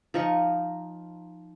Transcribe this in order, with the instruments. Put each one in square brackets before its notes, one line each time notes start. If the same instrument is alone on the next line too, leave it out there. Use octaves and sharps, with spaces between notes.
[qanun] F3 D#4 C#6